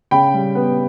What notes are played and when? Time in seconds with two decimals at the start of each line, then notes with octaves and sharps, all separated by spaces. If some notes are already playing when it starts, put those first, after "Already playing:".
0.11 C#3 G5 B5
0.34 G3
0.55 B3